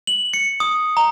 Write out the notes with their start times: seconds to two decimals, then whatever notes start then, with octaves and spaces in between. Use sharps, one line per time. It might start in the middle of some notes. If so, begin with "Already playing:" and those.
0.07 F#7
0.34 C#7
0.60 D#6
0.97 A#5